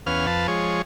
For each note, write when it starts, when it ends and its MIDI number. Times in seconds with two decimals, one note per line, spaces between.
0.06 0.27 40
0.06 0.27 59
0.06 0.27 61
0.06 0.27 77
0.06 0.27 89
0.27 0.47 41
0.27 0.47 71
0.27 0.47 77
0.27 0.47 81
0.48 0.82 53
0.48 0.82 56
0.48 0.82 73